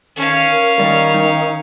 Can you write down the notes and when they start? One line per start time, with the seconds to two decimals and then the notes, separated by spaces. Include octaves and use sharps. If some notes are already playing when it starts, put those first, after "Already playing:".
0.16 D#3 C#4 F5
0.50 A#4
0.80 D#3 G3
1.14 D#4